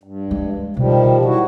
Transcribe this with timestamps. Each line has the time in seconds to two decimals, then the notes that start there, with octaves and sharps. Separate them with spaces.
0.04 G2
0.31 G#3
0.77 B2 D#3 F3 G3
1.25 F#3 E4 F#4